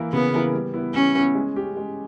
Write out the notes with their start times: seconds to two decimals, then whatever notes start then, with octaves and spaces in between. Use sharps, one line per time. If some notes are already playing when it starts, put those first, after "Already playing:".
Already playing: E3 A#3 E4 A#4
0.12 C#3 B3
0.33 E3 A#3 E4 A#4
0.54 G3
0.74 B3 E4
0.94 G3 C#4
1.15 B3 E4
1.35 G#3
1.56 C#4 G4
1.77 G#3